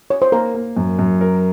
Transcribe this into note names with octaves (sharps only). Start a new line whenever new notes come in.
C#5
C5
A#3 A#4
A#3
F#2
F#2
A#4